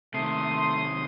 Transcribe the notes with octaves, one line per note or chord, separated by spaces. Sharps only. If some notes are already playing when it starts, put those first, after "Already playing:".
C3 D#3 A3 C6 D#6